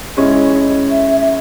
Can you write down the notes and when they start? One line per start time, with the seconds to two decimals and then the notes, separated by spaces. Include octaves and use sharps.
0.16 G#3 C#4 E4 D#5
0.90 E5
1.21 E5